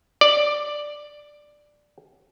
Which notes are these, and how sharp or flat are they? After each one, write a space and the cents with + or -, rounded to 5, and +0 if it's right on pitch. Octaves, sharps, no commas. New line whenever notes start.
D5 +5